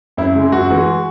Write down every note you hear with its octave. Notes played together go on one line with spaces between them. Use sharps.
F#2 E4
C#3 G#3
F#2 F#4
E3 G#3